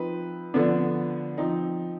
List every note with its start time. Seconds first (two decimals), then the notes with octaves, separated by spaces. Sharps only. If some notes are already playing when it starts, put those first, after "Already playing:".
Already playing: F3 C4 D#4 B4
0.54 D3 F3 B3 D4
1.38 F3 C4 D#4